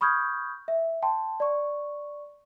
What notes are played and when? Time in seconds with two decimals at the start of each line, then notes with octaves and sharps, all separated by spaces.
0.01 B5 C#6 D#6 F6 G6 G#6
0.68 E5
1.02 G5 A5 C6
1.40 D5 C#6